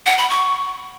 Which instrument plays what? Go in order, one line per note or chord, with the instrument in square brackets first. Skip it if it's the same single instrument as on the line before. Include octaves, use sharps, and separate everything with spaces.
[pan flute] F#5
B5
C#6